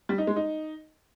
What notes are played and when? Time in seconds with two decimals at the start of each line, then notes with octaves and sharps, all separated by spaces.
0.09 G3
0.18 D#4
0.27 G#3
0.36 D#4